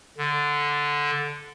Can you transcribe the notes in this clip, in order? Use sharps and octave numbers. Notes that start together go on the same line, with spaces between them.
D3